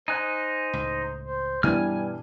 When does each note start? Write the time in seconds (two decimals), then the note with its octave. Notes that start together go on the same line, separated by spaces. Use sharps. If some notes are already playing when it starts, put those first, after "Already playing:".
0.08 D#4 C5 G#5 F#6
0.73 C#2 A2
1.21 C5
1.63 G2 B2 E3 G3 B3 D4 G#5 F6